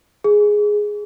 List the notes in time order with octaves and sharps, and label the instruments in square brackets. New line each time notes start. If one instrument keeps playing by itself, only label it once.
[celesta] G#4